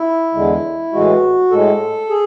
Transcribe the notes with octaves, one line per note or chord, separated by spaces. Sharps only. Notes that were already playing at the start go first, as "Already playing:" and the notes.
Already playing: E4
E2 D3 G#3
A2 E3 G#3 F#4
A2 G#3 A4
G#4